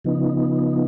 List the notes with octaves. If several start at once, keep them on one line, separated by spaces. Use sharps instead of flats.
C#3 F3 B3 D#4